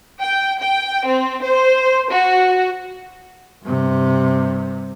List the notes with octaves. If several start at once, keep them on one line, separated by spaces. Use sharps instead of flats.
G5
G5
C4
C5
F#4
G2 C3